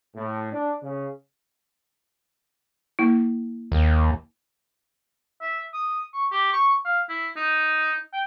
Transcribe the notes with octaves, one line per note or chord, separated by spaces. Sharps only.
A2
D4
C#3
A#3 E4
D#2
E5
D#6
C#6
G4
C#6
F5
E4
D#4
G5